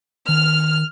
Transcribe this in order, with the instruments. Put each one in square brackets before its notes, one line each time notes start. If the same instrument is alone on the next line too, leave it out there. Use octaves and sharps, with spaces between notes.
[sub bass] D#3 [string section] F6